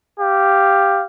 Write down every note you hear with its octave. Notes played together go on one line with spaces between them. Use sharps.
G4 F5